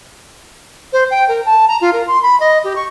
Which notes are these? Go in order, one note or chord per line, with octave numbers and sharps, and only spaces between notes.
C5
G5
A#4
A5
A#5
F4
A#4
C6
B5
D#5
G4
C#6